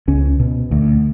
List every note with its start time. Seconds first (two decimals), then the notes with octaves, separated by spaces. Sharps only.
0.08 C#2 C#4
0.40 B2
0.71 D2